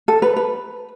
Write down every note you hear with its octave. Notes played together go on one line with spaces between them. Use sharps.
A4
B4
B4